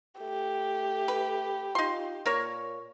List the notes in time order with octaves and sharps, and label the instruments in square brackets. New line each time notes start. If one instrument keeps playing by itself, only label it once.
[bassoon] A3 [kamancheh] G4
[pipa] B4
[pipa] D#4 C6 [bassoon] F4
[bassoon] A#2 [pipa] A#3 A#4 C#5